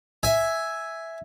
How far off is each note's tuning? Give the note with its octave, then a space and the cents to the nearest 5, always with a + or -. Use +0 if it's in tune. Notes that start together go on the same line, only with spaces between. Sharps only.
E5 +0 G#5 +0